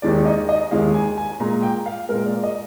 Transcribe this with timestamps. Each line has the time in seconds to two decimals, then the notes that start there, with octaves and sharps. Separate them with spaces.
0.02 D#2 D#3 G#3 D5
0.26 D#5
0.49 D#5
0.71 D#2 D#3 G#3 F5
0.94 G#5
1.18 G#5
1.40 A#2 G#3 A#5
1.63 G5
1.86 F5
2.09 A#2 G#3 A#4
2.26 D5
2.43 D#5